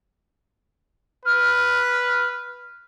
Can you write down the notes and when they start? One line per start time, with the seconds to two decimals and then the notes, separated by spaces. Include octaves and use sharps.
1.25 B4 F6